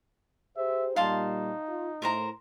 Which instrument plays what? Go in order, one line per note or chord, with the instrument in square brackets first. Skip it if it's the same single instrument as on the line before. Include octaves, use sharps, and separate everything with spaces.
[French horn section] G4 G#4 C5 [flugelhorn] E5
[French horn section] A#2 G3 [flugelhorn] D#4 [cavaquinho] F5 A5 C6
[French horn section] F4
[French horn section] A2 E4 [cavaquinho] A#4 C5 A#5